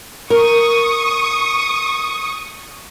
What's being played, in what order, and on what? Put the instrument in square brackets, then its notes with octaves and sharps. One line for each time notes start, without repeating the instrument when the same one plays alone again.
[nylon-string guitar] A#4 [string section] C#6 D#6